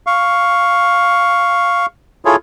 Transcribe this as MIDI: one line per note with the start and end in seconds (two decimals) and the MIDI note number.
0.07 1.86 77
0.07 1.86 85
2.25 2.36 64
2.25 2.36 65
2.25 2.36 68
2.25 2.36 69
2.25 2.36 73